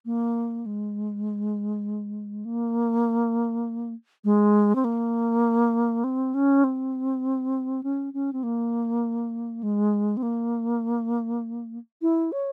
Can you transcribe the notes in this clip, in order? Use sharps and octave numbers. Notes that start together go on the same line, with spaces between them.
A#3
G#3
A#3
G#3
C4
A#3
C4
C#4
C4
C#4
C#4
C4
A#3
G#3
C4
A#3
E4
C#5